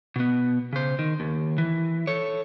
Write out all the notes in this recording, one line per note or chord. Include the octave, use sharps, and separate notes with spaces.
B2 B3
C#3 C5
D#3
D#2
E3
A4 C#5